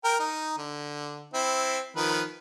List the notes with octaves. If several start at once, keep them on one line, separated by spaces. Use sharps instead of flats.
A#4 G5
D#4
D3
C4 E4
D#3 F3 B4